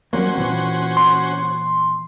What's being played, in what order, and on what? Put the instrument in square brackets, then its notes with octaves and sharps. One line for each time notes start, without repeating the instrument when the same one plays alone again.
[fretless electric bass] F#3 G3 A#3 [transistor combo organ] C#4 F#4 C5
[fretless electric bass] A#2 E3 C4
[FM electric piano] C6